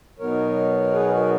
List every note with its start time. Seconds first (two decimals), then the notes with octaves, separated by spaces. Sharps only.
0.19 B2 F#3 B3 D#4 A#4 C#5
0.92 G#4 B4
1.11 F#4 A#4